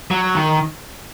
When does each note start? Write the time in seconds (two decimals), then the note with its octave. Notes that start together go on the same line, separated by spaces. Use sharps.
0.11 F#3
0.35 D#3